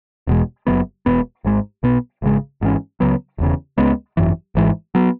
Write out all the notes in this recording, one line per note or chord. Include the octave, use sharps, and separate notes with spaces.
E1 E2 B2 G#3
F#1 F#2 E3 B3
E1 E2 B2 B3
G#1 G#2 G#3
B1 B2 B3
G#1 F#2 C#3 G#3
G#1 G#2 E3 C#4
C#2 C#3 F#3 B3
E1 E2 C#3
C#2 C#3 G#3 B3
G#1 F#2 E3
G#1 G#2 E3 G#3
F#3 B3